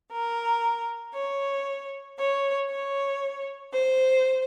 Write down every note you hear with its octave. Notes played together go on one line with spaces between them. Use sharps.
A#4
C#5
C#5
C#5
C5